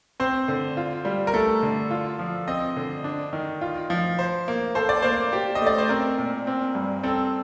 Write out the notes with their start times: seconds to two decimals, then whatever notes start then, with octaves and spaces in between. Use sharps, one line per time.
0.20 C4 C5
0.48 D3
0.77 F4
1.05 G3
1.27 A#4
1.33 A3 A4
1.63 D3
1.91 F4
2.19 F3
2.48 C4 D#5
2.76 D3
3.04 D4
3.33 D#3
3.61 F4
3.90 F3
4.19 C5
4.48 A#3
4.75 A4 C5
4.89 D5
5.02 A#3 C5
5.33 G4
5.55 D#5
5.62 A3
5.67 D5
5.78 C5
5.89 C4 A#4
6.18 A#2
6.47 C4
6.75 G2
7.03 C4 A4